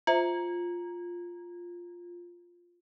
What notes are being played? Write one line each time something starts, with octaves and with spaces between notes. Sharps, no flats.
F4 C5 E5 A#5